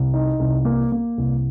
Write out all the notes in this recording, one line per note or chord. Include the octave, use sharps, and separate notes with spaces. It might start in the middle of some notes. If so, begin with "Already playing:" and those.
Already playing: C2
D#4
C2
A#3
A#3
C2